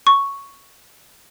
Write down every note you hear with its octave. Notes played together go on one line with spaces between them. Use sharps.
C#6